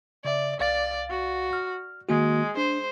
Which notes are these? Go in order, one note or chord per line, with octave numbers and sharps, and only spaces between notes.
C#3 D5 E5
C2 D5 F5 A6
F#4
F6
D#3 G#3 A#3 F#4
D4 C5